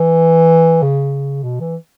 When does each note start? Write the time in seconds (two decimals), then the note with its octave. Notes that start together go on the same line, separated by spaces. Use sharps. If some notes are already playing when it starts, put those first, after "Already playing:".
Already playing: E3
0.82 C#3
1.43 B2
1.60 E3